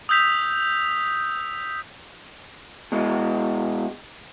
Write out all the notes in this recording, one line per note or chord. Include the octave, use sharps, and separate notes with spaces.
D#6 E6 G6 B6 F7
B2 G#3